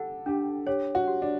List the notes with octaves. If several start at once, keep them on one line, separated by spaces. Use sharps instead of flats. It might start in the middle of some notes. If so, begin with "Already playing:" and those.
Already playing: G4 A4 F#5
D4 G4
G4 C#5
F#4
G4
D4